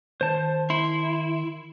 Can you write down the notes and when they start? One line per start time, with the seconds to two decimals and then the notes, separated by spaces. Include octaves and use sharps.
0.21 D#3 C5 A5
0.70 E4 C6